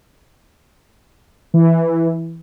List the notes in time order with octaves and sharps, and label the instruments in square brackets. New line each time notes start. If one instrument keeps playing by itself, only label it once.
[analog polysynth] E3